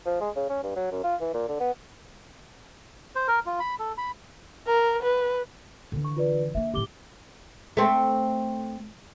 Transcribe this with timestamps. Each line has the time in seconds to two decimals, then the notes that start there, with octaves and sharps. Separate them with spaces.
0.06 F3
0.20 G#3
0.36 C#3
0.50 C#4
0.63 G2
0.76 F#3
0.91 F#2
1.04 F4
1.21 E3
1.34 A#2
1.48 D3
1.60 B3
3.15 C5
3.28 A#4
3.46 F4
3.60 B5
3.79 A4
3.98 B5
4.67 A#4
5.02 B4
5.92 D3 E3
6.05 C#6
6.16 F4 B4 D5
6.55 D3 A#3 E5
6.74 F2 A2 G4 D6 G7
7.77 A3 C4